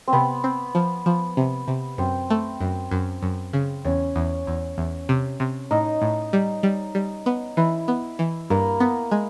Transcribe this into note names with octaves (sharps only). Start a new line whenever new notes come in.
C4
C3 B3
C4
F3
F3
C3
C3
F#2 C4
A3
F#2
F#2
F#2
C#3
E2 C#4
E2
E2
E2
C3
C3
A2 D#4
A2
G3
G3
G3
B3
E3 E4
B3
E3
G2 A#3
B3
G#3